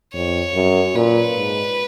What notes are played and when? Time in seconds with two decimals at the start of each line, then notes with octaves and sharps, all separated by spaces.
0.14 F2 C#5
0.54 F#2
0.95 A#2 B4
1.36 G#2